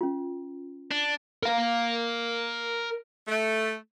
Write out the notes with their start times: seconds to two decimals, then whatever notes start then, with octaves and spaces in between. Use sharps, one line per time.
0.01 C#4 F4
0.91 D4
1.43 A#4 F5
3.28 A3